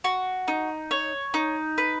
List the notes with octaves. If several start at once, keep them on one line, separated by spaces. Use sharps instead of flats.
F#4
D#4
C#5
D#4
B4